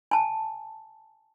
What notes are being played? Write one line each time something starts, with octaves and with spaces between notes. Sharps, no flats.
G#5 A5